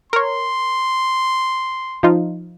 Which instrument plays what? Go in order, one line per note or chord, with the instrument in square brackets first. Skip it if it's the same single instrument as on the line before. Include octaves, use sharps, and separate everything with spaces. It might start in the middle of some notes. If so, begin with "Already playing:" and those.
[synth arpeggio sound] A#4 C#5 [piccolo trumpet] C6
[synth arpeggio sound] F3 D#4 F4